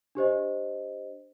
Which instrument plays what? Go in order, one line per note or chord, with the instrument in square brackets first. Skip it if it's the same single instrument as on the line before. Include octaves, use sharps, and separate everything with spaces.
[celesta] D4 G4 C5 D#5